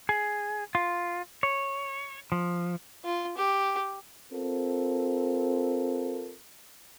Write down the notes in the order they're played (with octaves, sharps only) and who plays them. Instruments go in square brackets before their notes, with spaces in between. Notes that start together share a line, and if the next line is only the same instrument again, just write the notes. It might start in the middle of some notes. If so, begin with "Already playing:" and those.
[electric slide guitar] G#4
F4
C#5
F3
[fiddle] F4
G4
[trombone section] C4 F4 A4 A#4